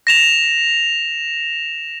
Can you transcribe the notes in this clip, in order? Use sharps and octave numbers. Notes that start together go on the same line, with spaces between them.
A#6 E7 F7